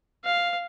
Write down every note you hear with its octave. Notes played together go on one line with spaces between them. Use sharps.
F5